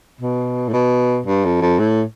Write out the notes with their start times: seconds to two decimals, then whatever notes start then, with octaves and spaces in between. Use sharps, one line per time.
0.21 B2
0.68 A2
0.73 B2
1.26 G2
1.45 F2
1.61 F2
1.79 A2